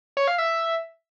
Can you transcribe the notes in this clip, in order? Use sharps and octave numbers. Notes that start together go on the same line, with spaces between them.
C#5
F5
E5